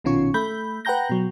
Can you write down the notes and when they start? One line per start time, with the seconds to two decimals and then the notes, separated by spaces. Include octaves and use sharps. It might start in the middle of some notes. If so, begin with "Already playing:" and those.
0.04 A#1 B2 D#3 C#4 F4 C#6
0.34 A3 B5 G6
0.85 B4 F#5 G5 A#5 G6 A#6
1.10 B2 F#3